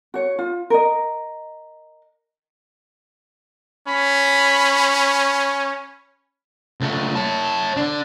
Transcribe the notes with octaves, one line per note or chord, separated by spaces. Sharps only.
F#4 C#5
F4
A#4 D#5
C#4 B5
C#2 A3
C#5 A5
D3 D4